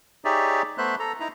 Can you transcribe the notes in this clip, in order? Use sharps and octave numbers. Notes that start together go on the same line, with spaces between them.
D#4 G4 G#4 C#5 D5 E5
A3 B3 C5 E5 F#6
A4 A#5
D#4 E4 A#5